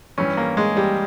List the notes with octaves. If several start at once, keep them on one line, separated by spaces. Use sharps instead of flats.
G2 E3 C#4
A#3
G#3
G3